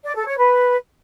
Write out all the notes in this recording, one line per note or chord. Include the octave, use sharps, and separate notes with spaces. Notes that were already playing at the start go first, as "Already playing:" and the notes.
D5
A4
C#5
B4